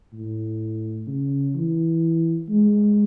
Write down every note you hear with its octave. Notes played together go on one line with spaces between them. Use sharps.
A2
C#3
E3
G#3